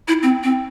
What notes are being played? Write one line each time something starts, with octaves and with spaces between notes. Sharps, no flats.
E4
C4
C4